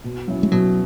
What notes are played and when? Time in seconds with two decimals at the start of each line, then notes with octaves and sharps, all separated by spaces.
0.04 B2
0.28 F#3 C#4 E4
0.43 G#3
0.52 B2 F#3